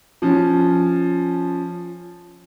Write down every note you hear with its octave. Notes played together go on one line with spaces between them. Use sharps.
F3 C#4